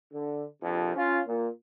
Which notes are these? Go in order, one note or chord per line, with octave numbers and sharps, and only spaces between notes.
D3
A#1 F2 C3 F3
C#4 F4
A#2